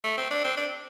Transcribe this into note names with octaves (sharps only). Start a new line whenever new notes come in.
A3
C4
D4
C4
D4